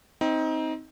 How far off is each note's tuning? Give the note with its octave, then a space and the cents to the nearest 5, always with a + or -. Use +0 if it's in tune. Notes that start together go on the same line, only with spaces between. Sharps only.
C4 +0 D#4 +20 G5 +0